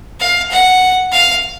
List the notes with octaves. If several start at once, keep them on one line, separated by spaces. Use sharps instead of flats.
F5
F#5
F5